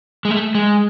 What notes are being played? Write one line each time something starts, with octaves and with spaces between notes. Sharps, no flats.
G#3
A3
G#3